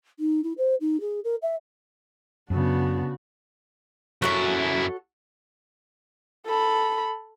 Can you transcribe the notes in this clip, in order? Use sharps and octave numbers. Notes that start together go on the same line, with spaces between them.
D#4
E4
C5
D#4
G#4
A#4
E5
F#2 C#3 B3 D4 F#4
F#2 E4 F#4 A4 C#5
A4 B5